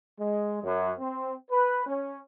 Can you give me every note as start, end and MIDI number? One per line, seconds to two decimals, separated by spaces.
0.19 0.60 56
0.63 0.91 42
0.99 1.33 60
1.50 1.86 71
1.86 2.16 61